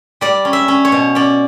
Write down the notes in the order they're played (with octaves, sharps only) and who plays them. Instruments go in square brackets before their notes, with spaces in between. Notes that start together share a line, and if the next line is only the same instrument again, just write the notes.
[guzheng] G3 D5
C#4
E5
C#4
C#5
B2
C#4 D5